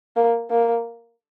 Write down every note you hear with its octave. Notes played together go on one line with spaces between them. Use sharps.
A#3
A#3